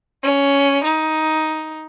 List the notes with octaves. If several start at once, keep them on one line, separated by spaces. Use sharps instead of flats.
C#4
D#4